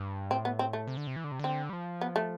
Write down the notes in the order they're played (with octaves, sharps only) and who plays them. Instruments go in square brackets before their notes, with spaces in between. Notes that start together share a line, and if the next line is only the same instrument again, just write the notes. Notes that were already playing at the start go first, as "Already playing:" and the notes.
Already playing: [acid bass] G2
[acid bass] A2 [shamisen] C4
[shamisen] B3
C4
A3
[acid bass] C3
D3
C3
E3
D3
C3
[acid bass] D3 [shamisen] C4
[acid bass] G3
F3
[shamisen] B3
A3